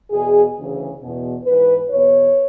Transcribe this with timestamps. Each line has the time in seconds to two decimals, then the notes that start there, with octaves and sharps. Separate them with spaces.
0.10 E2 B2 G#4
0.56 D2 C#3 E3
1.01 E2 B2
1.45 G#2 E3 B4
1.90 E2 B2 C#5